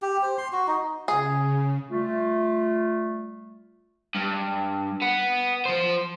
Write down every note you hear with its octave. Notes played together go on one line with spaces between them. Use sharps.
G4
C5
C6
F#4
D#4
C#3 G#4
G3 A3 F4
G2
B3
F3 C5